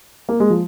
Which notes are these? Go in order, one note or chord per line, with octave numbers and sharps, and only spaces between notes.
A#3
G#3
F3